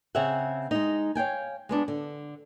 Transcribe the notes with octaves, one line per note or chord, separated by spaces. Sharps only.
C#3 C4 G#4 C#5 E5 F#5
G#3 D#4
C#5 F5 G5 G#5
G#3 B3 D4
D3